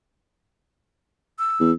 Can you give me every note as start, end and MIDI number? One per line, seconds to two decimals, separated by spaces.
1.39 1.71 88
1.60 1.72 40